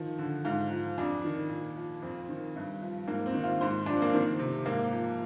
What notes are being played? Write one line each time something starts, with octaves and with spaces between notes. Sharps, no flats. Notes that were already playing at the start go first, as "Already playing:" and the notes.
Already playing: D#3 F3
D3
G#2 F4
F3
F2 D4
D#3
A#2
F3
F2 C4
D#3
G2
F3
G#2 A#3
C4
D#3
F4
G#2 C5
F3 D4
A#3
D#3 C4
C3
G#2 A#3
F3